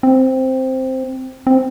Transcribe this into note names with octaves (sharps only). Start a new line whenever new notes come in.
C4
C4